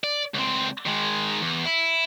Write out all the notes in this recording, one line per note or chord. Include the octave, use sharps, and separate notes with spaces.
D5
C#2 C4
D#3 G#3
E2
E4